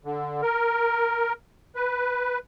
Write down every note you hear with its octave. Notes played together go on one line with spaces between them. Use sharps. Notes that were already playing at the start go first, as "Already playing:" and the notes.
D3
A#4
B4